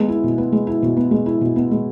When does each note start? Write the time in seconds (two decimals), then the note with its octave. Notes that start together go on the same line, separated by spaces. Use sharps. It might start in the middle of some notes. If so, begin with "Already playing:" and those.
Already playing: G#3 B3
0.08 E4
0.24 B2
0.38 B3
0.52 G#3
0.67 E4
0.82 B2
0.97 B3
1.11 G#3
1.26 E4
1.41 B2
1.56 B3
1.71 G#3